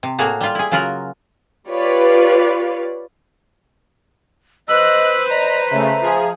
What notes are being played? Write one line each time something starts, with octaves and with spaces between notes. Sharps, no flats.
C3
A2 A#3 F#4 G#4 A#5
G3 F4
E4 G#4
C#3 F#3 F4 F#4 A#4
F4 G4 B4 C#5 D5 F5
B4 C5 D#5 E6 F#6
D5 D#5 A#5
C#3 A3 E5 A#5
F3 G#4